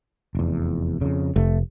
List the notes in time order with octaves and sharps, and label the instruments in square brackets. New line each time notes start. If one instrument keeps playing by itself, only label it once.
[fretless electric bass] F1 E2
F2 C#3
[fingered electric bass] F1 [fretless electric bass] A3